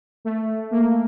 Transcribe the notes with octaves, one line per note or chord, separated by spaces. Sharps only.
A3
A#3